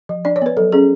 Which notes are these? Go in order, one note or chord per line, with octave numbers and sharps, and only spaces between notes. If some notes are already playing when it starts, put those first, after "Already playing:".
F3
D4 D5
C#5
B3 B4
F#3 A4
C#4 G#4